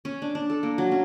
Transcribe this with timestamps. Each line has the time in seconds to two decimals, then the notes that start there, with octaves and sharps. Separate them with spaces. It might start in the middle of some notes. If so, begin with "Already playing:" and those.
0.05 C#4
0.22 D4
0.35 D4
0.50 A4
0.63 A#3
0.78 F#3
0.92 C#4